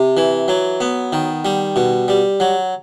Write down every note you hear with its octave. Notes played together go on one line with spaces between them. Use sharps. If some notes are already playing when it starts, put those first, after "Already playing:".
Already playing: C3
E3
F#3
B3
D#3
G3
B2
G3
F#3